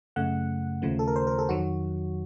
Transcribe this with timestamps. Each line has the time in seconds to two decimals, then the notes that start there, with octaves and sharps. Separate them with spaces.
0.16 F#2 C#3 A3 F#5
0.82 D#2 C#3 F3 A3
0.99 A4
1.08 A#4
1.16 C5
1.27 A#4
1.39 A4
1.49 F2 D#3 F#3 F#4